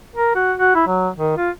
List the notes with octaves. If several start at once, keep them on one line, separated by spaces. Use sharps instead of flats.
A#4
F#4
F#4
E4
F#3
D#3
F4